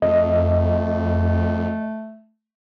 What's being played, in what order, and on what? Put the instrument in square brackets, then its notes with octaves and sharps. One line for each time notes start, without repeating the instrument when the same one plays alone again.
[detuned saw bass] F2 [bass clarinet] A3 [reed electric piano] D#5